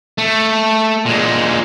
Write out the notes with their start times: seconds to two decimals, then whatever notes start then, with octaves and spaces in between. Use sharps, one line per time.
0.18 A3
1.06 A#2 G#3